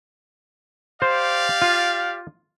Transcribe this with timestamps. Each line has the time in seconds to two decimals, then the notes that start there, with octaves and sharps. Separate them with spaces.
1.02 G4 C5 D5 F5
1.62 F4